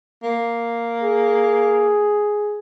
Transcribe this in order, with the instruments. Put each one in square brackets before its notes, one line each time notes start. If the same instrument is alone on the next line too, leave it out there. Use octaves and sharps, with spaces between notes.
[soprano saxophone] A#3
[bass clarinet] G#4